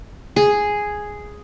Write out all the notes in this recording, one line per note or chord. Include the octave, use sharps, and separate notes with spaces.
G#4